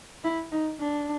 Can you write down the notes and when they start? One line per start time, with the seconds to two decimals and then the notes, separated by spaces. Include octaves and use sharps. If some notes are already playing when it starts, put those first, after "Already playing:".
0.24 E4
0.52 D#4
0.80 D4